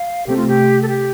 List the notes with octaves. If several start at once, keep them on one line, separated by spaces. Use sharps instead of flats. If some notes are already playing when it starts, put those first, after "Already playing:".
Already playing: F5
C3 A3 C4 G4
F4
G4
A4
G4